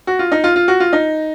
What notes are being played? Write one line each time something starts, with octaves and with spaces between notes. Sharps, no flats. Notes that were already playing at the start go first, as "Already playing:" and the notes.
F#4
F4
D#4
F4
F4
F#4
F4
D#4